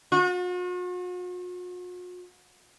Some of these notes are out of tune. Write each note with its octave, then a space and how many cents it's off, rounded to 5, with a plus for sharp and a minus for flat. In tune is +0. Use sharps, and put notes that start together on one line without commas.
F#4 -45